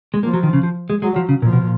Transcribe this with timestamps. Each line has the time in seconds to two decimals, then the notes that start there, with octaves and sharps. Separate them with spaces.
0.14 G#3
0.23 F3 A#3
0.33 F#3
0.43 D#3
0.53 C#3
0.63 F3
0.90 G#3
1.02 F#3 G#3
1.16 F3
1.29 C#3
1.42 A#2 F3
1.53 B2
1.61 A#2